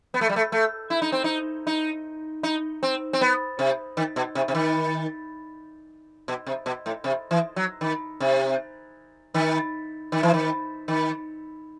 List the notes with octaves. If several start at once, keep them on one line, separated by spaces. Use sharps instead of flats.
B3
A3
G3
A3
A3
E4
D#4
C4
D#4
D#4
D#4
C4
C4
B3
C3
D#3
B2
C3
C3
D#3
B2
C3
B2
A2
C3
E3
F#3
D#3
C3
D#3
D#3
E3
D#3
D#3